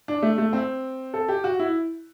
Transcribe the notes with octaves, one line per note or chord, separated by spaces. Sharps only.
D4
A3
A3
C4
A4
G4
F#4
E4